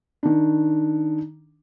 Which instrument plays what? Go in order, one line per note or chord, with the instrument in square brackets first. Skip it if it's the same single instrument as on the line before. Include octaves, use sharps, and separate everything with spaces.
[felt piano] D#3 D4